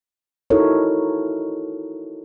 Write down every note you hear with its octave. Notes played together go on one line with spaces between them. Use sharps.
D#4 E4 F#4 A4 A#4 C#5